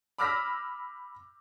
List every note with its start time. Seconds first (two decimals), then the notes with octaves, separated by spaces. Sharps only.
0.18 B5 D6 E6 F6 A#6 B6